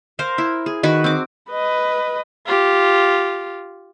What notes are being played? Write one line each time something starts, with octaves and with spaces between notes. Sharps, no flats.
A#4 C5 F5
E4
G#4
D#3 F#4 B4 C#6
C4 D6
B4 D#5
F4 G4